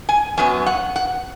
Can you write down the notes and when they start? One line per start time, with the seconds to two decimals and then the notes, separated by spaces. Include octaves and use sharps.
0.09 G#5
0.37 F#2 F#3 B3 G#5
0.66 F#5
0.96 F#5